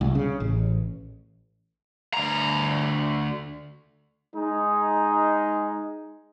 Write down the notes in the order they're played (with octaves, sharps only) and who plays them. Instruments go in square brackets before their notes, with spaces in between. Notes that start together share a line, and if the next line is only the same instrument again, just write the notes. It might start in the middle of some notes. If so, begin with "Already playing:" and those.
[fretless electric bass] C2
C#3
A1
[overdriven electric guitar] D2 A#5
[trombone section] G#3 D#4